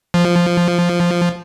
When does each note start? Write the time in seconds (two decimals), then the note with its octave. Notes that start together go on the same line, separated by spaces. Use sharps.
0.14 F3